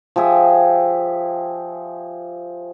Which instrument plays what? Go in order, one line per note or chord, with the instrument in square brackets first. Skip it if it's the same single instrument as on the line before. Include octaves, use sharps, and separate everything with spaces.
[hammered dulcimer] F3 G4 G#4 E5